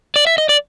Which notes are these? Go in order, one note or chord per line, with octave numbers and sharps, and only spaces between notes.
D5
E5
D#5
D5